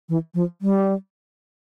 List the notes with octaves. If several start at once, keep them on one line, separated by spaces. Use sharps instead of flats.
E3
F3
G3